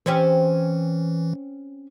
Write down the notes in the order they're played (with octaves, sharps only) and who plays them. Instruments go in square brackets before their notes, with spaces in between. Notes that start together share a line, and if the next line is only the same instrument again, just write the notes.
[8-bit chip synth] E3 [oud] C4 C#4 G4